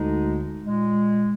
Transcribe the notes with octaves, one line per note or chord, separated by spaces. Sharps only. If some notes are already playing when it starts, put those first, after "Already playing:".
Already playing: D2 D3 G#3 D#4
A#2 G#3